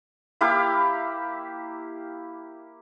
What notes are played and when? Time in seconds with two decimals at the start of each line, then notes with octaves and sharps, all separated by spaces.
0.41 A#3 E4 G4 F5